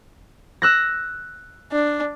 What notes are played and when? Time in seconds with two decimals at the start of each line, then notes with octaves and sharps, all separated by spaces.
0.62 E6 F#6 A#6
1.72 D4